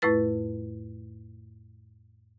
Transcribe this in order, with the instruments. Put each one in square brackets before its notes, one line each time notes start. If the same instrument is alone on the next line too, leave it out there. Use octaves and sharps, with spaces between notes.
[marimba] F2 A2 A3 E4 B4 A6